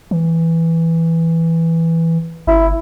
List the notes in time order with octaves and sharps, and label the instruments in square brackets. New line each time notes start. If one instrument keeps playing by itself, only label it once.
[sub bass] E3
[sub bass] G1 [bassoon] E4